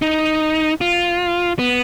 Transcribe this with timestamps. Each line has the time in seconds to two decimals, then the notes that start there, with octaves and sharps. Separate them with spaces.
0.02 D#4
0.81 F4
1.59 B3